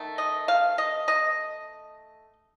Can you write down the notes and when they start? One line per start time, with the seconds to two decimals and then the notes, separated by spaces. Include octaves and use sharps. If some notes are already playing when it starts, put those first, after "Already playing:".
Already playing: D#3 A3
0.18 D#5
0.48 F5
0.78 D#5
1.08 D#5